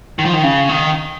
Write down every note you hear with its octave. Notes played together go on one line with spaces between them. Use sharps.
D#3
F3
D#3
C#3
D#3